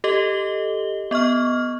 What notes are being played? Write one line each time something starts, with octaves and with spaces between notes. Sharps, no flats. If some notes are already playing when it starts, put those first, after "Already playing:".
G4 A4 D#5 G7
B3 D#5 C#6 F6